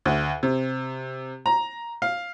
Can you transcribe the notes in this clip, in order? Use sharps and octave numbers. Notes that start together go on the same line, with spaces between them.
D2
C3
A#5
F5